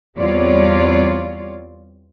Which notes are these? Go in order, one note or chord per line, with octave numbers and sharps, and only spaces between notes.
E2 G3 C4 F4 C#5 D5